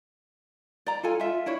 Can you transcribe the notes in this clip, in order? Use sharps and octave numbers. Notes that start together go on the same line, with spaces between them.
D5 A#5
F4 A4 G#5
F4 E5
D4 E4 C#5